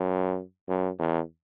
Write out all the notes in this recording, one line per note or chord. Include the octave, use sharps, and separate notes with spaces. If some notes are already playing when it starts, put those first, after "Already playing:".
Already playing: F#2
F#2
E2